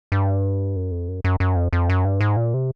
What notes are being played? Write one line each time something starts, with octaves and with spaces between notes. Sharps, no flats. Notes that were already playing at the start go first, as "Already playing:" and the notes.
G2
F#2
F2
F#2
F#2
F#2
F2
F2
F#2
G2
G#2
A#2
C3